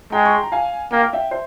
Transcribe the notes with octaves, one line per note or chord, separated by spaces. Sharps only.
G#3 G5 A#5
C#6
C6
A#5
F5 G#5
A#3 G5
F5
E5 G5
C5 E5